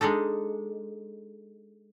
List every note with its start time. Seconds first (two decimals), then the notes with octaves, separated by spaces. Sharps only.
0.01 G#3 D4 D#4 A4